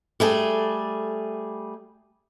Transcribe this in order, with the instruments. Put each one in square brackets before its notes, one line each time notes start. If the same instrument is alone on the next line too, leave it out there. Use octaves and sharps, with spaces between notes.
[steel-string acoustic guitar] G3 A3 G#4